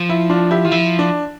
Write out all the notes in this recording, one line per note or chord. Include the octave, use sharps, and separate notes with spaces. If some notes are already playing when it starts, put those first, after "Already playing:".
Already playing: F3
E4
D4 F4
E4 G4
E3 F4
F3 E4
D4